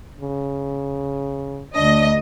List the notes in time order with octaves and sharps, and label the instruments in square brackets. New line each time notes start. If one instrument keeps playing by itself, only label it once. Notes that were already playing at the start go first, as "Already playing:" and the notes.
[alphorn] C#3
[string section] D2 D#5 [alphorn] D4